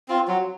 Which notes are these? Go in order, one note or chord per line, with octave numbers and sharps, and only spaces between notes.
C4 F4
F#3